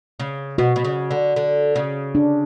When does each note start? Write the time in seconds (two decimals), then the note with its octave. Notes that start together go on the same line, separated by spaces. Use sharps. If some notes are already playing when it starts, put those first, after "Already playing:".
0.20 C#3
0.58 B2 F#4
0.76 B2
0.84 C#3
1.11 D3
1.36 D3
1.76 C#3
2.15 D4